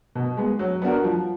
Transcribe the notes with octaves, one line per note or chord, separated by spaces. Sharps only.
B2
G#3 B3
F#3
B3 D4 F#4 A#4
F3